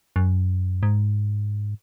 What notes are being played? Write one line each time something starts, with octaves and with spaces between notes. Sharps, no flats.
F#2
G#2